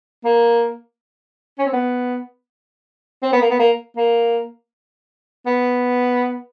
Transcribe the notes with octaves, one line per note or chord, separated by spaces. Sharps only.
A#3
C#4
C4
B3
C4
B3
A#3
B3
A#3
A#3
B3